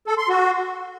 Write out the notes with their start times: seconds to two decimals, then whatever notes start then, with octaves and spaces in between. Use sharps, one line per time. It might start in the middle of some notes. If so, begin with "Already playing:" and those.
0.07 A4
0.18 C6
0.29 F#4